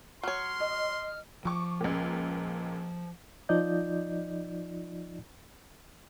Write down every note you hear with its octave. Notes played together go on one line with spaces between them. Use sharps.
F#3 C#5 C6 F6
D#5
F3 C#6 D6
C#2 A#2
F3 D#4 F4 D5 D#5 G6